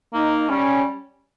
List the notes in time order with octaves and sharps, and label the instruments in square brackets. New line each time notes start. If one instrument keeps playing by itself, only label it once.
[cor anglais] A#3 [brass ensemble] D#4
[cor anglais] G3 [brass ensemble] C#4